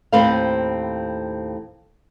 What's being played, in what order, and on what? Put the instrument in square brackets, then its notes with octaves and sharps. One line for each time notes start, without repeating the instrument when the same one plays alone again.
[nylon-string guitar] D#2 A2 C4 B4 C5 F5